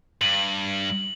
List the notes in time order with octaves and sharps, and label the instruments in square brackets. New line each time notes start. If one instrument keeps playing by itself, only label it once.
[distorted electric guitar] G2 [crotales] F#7